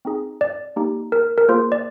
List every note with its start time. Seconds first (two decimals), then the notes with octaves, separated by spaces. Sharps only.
0.05 C4 D#4 G#4
0.41 D5
0.76 A#3 D#4 G4
1.12 A#4
1.38 A#4
1.49 A#3 F4 G#4 C5
1.72 D5